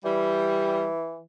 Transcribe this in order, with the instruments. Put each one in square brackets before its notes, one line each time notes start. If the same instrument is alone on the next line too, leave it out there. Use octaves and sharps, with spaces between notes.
[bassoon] E3 [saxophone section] G3